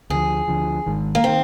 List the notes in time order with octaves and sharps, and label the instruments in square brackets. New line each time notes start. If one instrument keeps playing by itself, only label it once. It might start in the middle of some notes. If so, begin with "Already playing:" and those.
[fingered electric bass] D2 D3 F3 [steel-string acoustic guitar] G#4
[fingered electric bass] D2 D3 F3
G#1 G#2 D#3
[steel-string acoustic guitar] A#3
[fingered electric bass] D#3 [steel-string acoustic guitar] C4